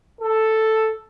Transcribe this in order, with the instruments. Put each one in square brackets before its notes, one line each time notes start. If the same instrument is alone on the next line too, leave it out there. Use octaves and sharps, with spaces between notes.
[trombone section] A4